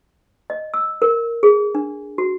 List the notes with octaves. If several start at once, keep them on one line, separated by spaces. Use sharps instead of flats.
D#5
E6
A#4
G#4
D4
F#4